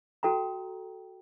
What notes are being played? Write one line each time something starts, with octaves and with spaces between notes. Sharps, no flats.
F#4 A4 G5 A#5